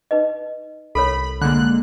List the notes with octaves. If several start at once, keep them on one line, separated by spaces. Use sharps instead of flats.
D#4 B4 D#5
C2 A4 A#4 C#5 B5
D3 G#3 A#3 F#6